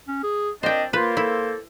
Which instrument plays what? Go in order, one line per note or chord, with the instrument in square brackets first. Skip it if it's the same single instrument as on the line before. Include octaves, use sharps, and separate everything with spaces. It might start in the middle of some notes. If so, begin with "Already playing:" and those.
[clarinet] C#4
G#4
[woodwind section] A#2 C4 D4 [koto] C5 G5 [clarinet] D#5
[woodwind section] A#3 C5 [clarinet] F4 [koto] B4
[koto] E4 [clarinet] A4